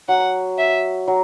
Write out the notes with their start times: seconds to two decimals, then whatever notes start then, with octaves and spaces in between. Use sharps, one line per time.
0.08 F#3 F#5
0.58 E5
1.08 F#3